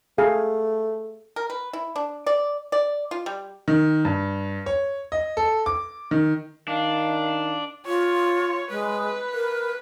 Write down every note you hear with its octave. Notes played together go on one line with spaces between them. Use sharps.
A3 G#4 F5
A#4
B4
E4
D4
D5
D5
F4
G3
D#3
G2
C#5
D#5
A4
D6
D#3
D#3 D4 F5
F4 C#5
G#3 B4
A#4